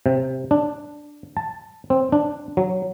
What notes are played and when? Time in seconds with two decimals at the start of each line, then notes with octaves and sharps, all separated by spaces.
0.06 C3
0.51 D4
1.37 A5
1.90 C4
2.12 D4
2.57 F#3